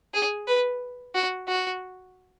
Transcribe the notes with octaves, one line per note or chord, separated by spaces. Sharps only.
G#4
B4
F#4
F#4